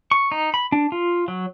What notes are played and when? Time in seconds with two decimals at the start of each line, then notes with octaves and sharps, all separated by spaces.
0.11 C#6
0.32 D#4
0.54 B5
0.72 D4
0.92 F4
1.28 F#3